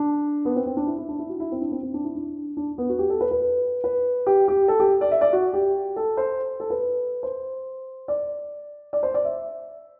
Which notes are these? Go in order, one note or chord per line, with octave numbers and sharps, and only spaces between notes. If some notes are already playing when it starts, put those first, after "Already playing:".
Already playing: D4
B3
C4
C4
D4
E4
E4
D4
E4
F#4
E4
C4
D4
C4
C4
D4
E4
D4
D4
B3
F#4
G4
A4
B4
B4
B4
G4
G4
A4
G4
D5
E5
D5
F#4
G4
A4
C5
A4
B4
C5
D5
D5
C5
D5
E5